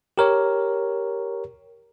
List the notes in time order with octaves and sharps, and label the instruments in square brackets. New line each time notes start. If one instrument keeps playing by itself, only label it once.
[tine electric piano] G4 A#4 C#5